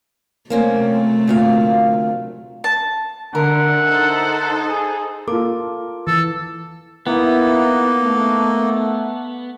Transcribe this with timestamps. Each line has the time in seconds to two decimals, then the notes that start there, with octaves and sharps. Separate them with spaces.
0.50 C3 F#3 A3 A#3 C4 C#4
1.28 D2 A#2 F5
2.64 A5
3.35 D3 A#4 E5 F#5
3.86 D#4 A4 C5
4.68 G#4
5.28 A#3 F4 A4 D6
6.07 E3 A4
7.07 A#3 B3 D#4 E4
8.03 A3